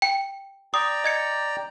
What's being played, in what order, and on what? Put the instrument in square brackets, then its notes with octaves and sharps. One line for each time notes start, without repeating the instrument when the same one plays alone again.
[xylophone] G5 C#7
[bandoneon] D5 G5 A#5 [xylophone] D#6
[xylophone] D#5 G#6 C#7